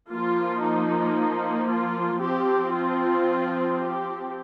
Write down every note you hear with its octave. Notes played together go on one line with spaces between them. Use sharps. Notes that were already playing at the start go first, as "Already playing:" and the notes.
F3 A#3 F4
D#4
F4
F3 C4 G4
F4
G4